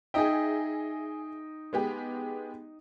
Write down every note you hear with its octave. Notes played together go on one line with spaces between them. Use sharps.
D#4 G#4 D#5 E5 G5
G#3 B3 G4